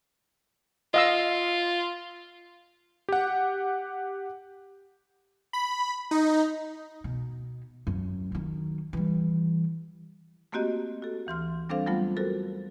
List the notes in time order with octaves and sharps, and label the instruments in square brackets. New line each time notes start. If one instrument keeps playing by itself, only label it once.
[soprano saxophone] F4 [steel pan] D#5 F5 E6
[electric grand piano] G4 F#5
[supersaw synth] B5
D#4
[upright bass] B2
F#2
D#3 F#3
E3 G3
[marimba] A3 A#3 C4 F#4 G4 D#5
F#4 A4
D2 E3 C6 F6
G3 C4 D4 A4 C5 F5
F#3 G3 A3 B3 F4
F#4 A4 A#4 C5